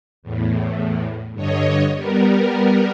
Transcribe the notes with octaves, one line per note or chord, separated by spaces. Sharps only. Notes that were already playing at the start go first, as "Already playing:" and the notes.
E2 A2
G2 D3 C#5 D#5
G3 B3 A#4